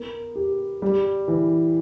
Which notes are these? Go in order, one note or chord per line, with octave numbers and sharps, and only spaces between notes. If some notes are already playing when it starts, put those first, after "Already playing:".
Already playing: B3 A#4
G4
G3
E3